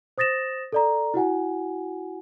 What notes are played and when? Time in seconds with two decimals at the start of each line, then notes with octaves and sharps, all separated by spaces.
0.18 C5 D#6 A6 A#6 E7
0.73 A4 D5 A#5
1.14 E4 F#4 F#5 G#5